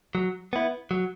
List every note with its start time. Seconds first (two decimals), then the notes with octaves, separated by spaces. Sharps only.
0.15 F#3
0.53 B3 E4
0.91 F#3